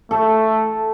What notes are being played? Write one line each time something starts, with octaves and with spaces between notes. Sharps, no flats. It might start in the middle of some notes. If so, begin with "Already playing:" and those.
A3 A4